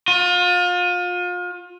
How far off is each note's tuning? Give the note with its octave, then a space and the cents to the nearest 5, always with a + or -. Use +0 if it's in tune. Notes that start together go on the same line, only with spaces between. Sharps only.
F4 +35